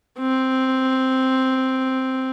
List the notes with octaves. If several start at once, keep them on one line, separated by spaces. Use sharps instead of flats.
C4